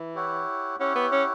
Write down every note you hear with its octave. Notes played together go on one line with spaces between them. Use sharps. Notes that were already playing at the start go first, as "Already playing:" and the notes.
Already playing: E3
E4 G4 C#5 F#5
C#4 E4 G4 C#5 F#5
B3
C#4